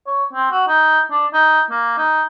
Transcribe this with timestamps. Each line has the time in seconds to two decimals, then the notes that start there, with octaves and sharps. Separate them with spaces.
0.07 C#5
0.33 C4
0.52 F#4
0.68 D#4
1.11 D4
1.33 D#4
1.71 A#3
1.98 D#4